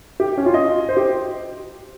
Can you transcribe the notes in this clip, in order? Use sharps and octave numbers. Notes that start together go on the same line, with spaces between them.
G4
C#4
F4
D#5
C5
G4